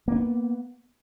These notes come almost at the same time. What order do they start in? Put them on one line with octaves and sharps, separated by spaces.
A#3 D4 B3